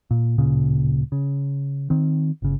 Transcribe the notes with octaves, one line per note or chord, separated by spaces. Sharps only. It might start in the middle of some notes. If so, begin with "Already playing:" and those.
A#2
D1 A#2 C#3
C#3
D#3 C4
G1 C#3